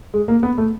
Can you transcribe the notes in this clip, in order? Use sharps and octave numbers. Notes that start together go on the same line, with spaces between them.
G#3
A#3
B3
A3